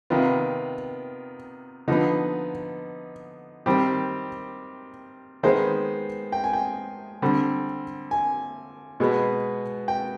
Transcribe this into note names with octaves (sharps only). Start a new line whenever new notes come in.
C3 D#3 B3 F4
D3 F3 B3 D#4
D#3 G3 C4 G4
D#3 G#3 B3 C5
G5
G#5
G5
D3 G3 C4
G#5
B2 G#3 B3
G5